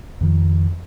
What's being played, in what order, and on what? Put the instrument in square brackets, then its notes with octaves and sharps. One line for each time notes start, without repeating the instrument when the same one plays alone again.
[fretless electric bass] F2 D#3 F3